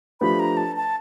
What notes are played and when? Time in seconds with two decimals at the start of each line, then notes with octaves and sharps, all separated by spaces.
0.21 F3 A3 D4 G4 B4 B5
0.40 A#5
0.57 A5
0.76 A5